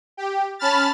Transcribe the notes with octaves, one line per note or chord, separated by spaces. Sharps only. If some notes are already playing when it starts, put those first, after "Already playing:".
G4
C#4 A5 B5 F6 A6